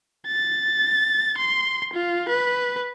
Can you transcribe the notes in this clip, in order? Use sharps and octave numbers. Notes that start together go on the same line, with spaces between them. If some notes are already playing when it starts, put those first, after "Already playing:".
A6
C6
F4
B4